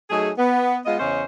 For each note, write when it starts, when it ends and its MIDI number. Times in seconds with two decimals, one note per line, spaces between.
0.10 0.31 54
0.10 0.31 57
0.10 0.31 63
0.10 0.31 68
0.38 0.79 59
0.86 0.99 56
0.86 0.99 59
0.86 0.99 65
0.86 0.99 75
1.00 1.24 40
1.00 1.24 49
1.00 1.24 61
1.00 1.24 72
1.00 1.24 73
1.00 1.24 75